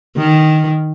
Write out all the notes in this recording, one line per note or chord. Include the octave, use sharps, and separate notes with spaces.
D#3